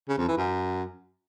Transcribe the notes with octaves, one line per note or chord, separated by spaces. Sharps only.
C#3
F2
E3
F#2